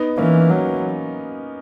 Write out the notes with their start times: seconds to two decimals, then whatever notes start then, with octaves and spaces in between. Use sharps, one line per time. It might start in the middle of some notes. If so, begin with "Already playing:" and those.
Already playing: B3 D#4
0.18 E3 A#3 C#4
0.50 F#3